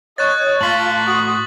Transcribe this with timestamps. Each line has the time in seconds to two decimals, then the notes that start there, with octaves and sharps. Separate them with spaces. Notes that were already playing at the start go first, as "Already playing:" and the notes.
0.18 C#5 D#5 C#6 F#6 A6
0.61 A2 F4 A5 C6 A6 B6 F#7
1.07 F#4 D#6 F#7